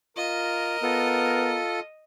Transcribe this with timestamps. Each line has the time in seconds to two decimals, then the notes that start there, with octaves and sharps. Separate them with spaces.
0.17 F4 A#4 D#5
0.83 B3 F4 A4